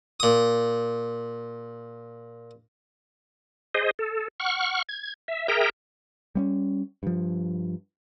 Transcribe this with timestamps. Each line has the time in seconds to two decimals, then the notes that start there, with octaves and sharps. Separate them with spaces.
0.20 A#2 D#6
3.74 G#4 C5 D#5
3.99 A4
4.40 F#5 C#6 F6
4.89 G#6
5.28 E5
5.48 G#4 A#4 E5 G5 A#5
6.35 G3 B3 C#4
7.03 G2 F3